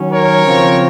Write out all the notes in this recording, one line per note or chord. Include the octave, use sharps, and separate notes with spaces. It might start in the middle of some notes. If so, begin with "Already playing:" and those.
Already playing: D#3 F#3 C#4
A#4 C#5
C#3 F3 C4